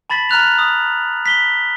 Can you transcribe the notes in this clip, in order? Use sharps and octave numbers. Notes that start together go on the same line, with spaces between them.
A5 B5 A6 B6 F#7
A#5 F6 F#6 F7
D#6
B6 G7